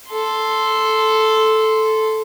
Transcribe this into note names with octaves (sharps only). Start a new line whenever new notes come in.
A4 C6